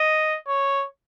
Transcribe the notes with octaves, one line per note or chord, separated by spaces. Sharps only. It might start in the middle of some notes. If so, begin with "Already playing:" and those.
Already playing: D#5
C#5